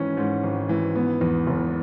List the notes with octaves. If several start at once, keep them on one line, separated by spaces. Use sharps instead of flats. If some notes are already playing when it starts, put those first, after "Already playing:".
Already playing: G#1 E3 C#4
G#2
G#1
E3
B3
E2
F#1